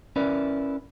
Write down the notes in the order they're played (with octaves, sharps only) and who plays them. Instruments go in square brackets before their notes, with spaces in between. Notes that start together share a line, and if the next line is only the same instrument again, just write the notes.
[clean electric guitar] C#4 E4 A#4 B4 D5